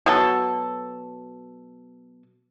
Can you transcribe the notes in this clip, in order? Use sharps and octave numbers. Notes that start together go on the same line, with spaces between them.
B2 F#3 A4